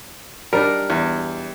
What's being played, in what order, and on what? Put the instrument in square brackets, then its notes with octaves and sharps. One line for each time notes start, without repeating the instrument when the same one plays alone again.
[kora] G3 D4 D#4 [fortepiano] A#4
[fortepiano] E2